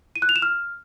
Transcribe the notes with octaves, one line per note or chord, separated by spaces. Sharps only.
D#7
F#6
F7
E7
F6